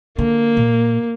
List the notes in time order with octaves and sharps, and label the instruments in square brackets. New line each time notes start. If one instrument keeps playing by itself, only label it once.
[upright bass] D3 [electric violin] A#3
[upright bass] A#2